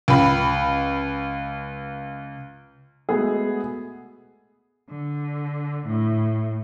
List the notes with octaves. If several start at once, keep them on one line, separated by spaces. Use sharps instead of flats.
C#2 B5
G#3 A3 B3 F#4 G#4
D3
A2